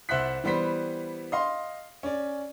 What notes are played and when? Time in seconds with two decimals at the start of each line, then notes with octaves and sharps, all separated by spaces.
0.09 C2 C5 E5 F#5 F#6 B6
0.44 E3 G3 B3 C5 B6
1.32 D#5 F5 C6
2.03 C#4 D5